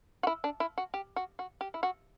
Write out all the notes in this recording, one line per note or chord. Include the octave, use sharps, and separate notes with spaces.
F#4
E4
D4
E4
F#4
G4
F#4
F#4
G4
E4
F#4